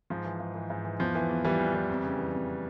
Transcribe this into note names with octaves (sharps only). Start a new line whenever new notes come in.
G#2 F3
E3
G#2
E3
G#2
E3
E2 F3
E3
E2
E3 G3
E2
E3
F2
C#3
E3
F2